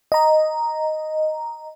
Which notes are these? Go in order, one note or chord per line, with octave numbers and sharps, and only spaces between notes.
D#5 A#5